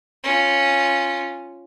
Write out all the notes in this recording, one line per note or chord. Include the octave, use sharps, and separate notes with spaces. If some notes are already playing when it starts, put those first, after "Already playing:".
C#4 F4